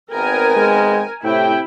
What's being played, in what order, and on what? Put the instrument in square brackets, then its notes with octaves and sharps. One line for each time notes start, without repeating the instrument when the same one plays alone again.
[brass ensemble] G#1 B3 G5 [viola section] A#4 G#5
[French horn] G#3
[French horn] A2 [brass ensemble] C3 G5 [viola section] E4